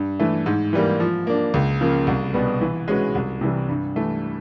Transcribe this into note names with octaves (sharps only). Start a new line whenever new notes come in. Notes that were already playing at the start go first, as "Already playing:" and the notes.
Already playing: G2
E3 A3
G#2
E3 G3 A#3
F3
A#3 D4
C#2
C#3 F3 A#3
C2
B2 G3 B3
E3
G#3 C#4 F#4 B4
C2
C3 E3 G3
G2
E3 A3